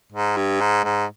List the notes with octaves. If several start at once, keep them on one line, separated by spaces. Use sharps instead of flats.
G#2
G2
G#2
G#2